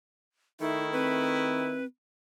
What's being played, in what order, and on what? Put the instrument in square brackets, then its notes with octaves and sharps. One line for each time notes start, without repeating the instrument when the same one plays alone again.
[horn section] D#3 A3 E4 [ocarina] D#4
[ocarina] C4 [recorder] B4